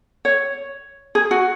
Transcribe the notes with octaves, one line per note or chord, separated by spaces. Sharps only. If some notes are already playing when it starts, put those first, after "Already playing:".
C#5
G#4
F#4